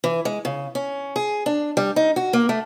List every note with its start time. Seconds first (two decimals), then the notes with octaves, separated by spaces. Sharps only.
0.04 E3
0.25 G#3
0.45 C#3
0.75 C#4
1.16 G#4
1.46 D4
1.77 G3
1.96 D#4
2.16 F#4
2.33 A#3
2.49 A3